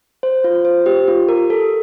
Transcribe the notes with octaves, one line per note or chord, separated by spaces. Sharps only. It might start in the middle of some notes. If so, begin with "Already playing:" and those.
C5
F4
C5
G4
F4
A#4
A4